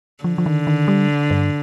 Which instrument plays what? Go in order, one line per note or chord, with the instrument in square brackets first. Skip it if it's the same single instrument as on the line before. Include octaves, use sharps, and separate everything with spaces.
[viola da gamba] D3 [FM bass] F3
[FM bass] F3
D#3
D#3
G3
G2